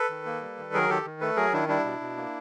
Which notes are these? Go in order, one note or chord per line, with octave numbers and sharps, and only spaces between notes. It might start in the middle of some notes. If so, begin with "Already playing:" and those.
Already playing: A4 B4
D#3
A#3
G3
D#3
F#3 G#4 A#4
D#3 G4 A4
D#3
A3 A4 B4
F#3 G#4 A#4
D#3 D4 E4
G3 D4 E4
B2
B2
A#3